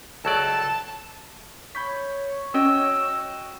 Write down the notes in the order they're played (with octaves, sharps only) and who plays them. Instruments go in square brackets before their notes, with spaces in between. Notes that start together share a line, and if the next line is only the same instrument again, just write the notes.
[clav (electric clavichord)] C#2 F#3 D5 [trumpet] A4 [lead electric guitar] A5
[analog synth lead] C#5 [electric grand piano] B5 G6 B6
[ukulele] C#4 [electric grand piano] F#4 D#5 G5 [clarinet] E6